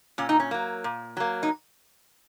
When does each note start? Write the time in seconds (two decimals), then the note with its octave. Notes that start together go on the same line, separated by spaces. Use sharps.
0.18 A#2 C#4
0.29 D#4
0.40 C#4
0.51 F#3 A#3
0.84 A#2
1.17 F#3 A#3
1.43 D#4